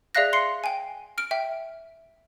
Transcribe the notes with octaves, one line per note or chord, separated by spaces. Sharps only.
G#4 D5 E5 F5 F#6 A#6
C6 C7 C#7
G5 G#5
F6 D7
E5 G5